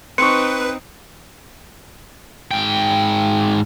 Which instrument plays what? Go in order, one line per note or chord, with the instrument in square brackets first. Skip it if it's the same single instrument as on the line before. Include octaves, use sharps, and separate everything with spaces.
[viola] C4 D#4 [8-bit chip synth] B4 [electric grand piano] C6 C#6 [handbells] C#7
[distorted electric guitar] G#2 G5